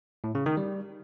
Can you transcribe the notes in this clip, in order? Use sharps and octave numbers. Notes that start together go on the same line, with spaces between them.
A2
C#3
D#3
G3